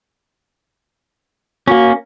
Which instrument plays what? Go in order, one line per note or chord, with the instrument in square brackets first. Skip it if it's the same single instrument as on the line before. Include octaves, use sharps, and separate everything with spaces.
[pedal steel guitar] A#3 C#4 [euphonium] F#4